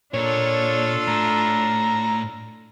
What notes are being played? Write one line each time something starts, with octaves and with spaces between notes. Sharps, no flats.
A#2 D4 F4 A4 C#5
A2 A#5